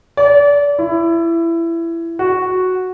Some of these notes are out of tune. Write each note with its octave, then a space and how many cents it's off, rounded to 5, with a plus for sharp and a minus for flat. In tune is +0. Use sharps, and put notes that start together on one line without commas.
D5 -30
E4 +20
F#4 -5